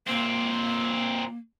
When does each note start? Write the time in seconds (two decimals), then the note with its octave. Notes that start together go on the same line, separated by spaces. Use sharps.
0.07 A#2 A#3 C4